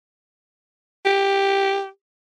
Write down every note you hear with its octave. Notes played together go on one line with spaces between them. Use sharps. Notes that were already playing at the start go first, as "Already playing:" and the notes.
G4